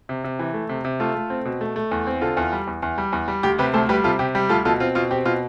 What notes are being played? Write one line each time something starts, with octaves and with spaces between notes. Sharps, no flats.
C3
C3
E3
A3
C3
C3
A3 F4 A4
A3
C4
B2
A3
A3
E2
C4
D3 F4 A4
E2
G3
E2
E2
G3
E2
G3
D2 G4
C3 G4 B4
D2 A4 C5
G3 G4 B4
C3 F4 A4
C3 G4
G3 G4
D2 F4 A4
B2 F4 A4
C4 F4
B2 F4
C4 G4
B2 F4